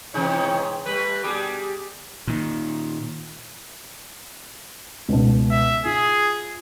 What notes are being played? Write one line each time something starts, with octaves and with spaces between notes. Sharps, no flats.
G#2 B2 E3 D#4 G#4 C#5
G3 A3 B4
B2 G3 D4 G4 G#4
A#2 D#3
C#2 B2
E5
F4 G#4